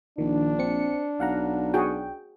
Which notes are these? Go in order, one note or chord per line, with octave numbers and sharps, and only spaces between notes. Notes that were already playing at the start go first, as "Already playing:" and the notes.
A#1 D#3 D4
C4 C#7
B1 F5 F#5 A#5
F#4 G#4 G5